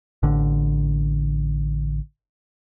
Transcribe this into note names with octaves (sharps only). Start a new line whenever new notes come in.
A1 D3